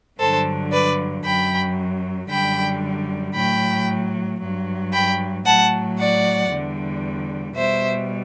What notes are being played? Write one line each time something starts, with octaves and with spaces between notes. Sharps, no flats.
G2 D3 F#3 A4 C5
B4 D5
F#2 F#3 G5 B5
F#2 D3 G3 G5 B5
A2 F#3 G5 B5
G2 F#3
G5 B5
A2 F#3 F#5 A5
D5 F#5
E2 D3 G3
B2 G3 C5 E5